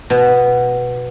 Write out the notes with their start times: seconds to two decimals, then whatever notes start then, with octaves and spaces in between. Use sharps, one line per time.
0.10 B2